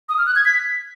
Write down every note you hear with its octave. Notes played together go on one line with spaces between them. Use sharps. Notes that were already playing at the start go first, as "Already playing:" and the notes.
D#6
F6
F#6
G#6
B6